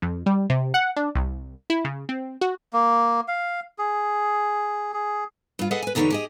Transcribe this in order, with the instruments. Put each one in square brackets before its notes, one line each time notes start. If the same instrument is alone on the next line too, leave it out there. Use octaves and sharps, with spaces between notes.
[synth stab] F2
G3
C3
F#5
D4
C2
E4
C#3
C4
F#4
[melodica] A#3
F5
G#4
G#4
[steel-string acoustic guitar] G2 F4
G#4 A4 B4 D#5 F#5
B4 G#5
E2 D3 D#4 G4 B4 C#5
G4 G#4 D#5